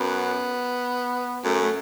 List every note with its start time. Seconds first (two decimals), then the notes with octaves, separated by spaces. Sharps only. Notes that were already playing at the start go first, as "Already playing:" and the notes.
Already playing: F#2 B3
1.44 F#2 A3
1.62 A3